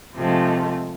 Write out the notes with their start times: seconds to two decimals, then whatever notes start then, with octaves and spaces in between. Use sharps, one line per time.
0.16 C3 F3 G#3 A3